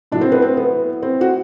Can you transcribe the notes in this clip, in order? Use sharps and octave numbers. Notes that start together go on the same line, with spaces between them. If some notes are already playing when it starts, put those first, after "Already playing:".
A2 F#3 D4
C4
B3
C4
B3
C4
F#4